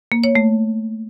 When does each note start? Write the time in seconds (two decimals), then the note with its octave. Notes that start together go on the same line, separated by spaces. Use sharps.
0.12 A#3
0.24 C#5
0.35 A3